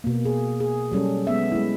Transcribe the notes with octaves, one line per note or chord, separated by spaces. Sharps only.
B2 A#3
G#4
G#4
F#3 G3 C#4 A4
G#3 B3 E5
G#3 E4